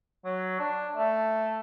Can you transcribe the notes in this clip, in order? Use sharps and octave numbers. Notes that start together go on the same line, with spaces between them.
F#3
D4
A3